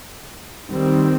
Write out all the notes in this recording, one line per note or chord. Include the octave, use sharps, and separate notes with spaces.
D#3 G3 C4